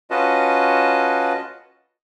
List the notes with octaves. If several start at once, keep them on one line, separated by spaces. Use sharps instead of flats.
C#4 F4 F#4 B4 D#5 A5